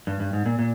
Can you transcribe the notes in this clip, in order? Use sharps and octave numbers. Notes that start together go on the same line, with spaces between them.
G2
G2
G#2
A#2
A#2